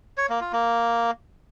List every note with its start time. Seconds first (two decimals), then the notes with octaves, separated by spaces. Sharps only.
0.18 C#5
0.29 A#3
0.41 F4
0.53 A#3